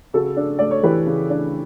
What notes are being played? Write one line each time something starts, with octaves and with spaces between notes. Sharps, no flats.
C#3 F#4 A4
D4
A3 D5
C#5
E3 G4 B4
C#3
D4